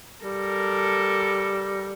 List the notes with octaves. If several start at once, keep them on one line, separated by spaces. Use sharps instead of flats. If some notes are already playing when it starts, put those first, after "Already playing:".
G3 A4 A#4